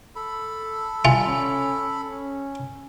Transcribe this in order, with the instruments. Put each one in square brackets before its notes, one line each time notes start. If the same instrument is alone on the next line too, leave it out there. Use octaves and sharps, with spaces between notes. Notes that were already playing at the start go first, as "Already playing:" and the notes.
[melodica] A4 B5
[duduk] G3 [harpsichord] F4 [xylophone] G#5
[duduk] C#4
C#4